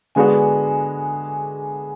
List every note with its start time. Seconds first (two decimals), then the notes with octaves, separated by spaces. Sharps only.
0.15 D3 G#3 B3 D4 F#4 G#5